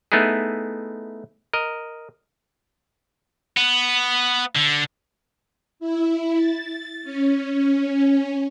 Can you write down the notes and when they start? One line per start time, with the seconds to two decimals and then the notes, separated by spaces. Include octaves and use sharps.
0.12 A3 B3 D#4 E4 G#4
1.53 A#4 D#5
3.57 B3
4.55 D3
5.80 E4
6.36 A6
7.03 C#4
7.53 C#4